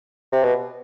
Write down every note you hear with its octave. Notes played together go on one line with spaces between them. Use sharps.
C3
B2